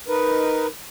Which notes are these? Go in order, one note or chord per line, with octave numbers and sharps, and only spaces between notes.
D#4 A#4 B4